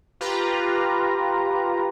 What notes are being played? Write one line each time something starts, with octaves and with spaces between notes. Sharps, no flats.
F4 G4 B4 A#5